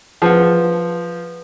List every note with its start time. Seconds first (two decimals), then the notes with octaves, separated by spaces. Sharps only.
0.22 F3 G#4 B4 F#5